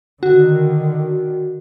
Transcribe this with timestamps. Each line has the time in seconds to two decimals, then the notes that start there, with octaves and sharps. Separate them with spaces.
0.23 D3 D#3 F#4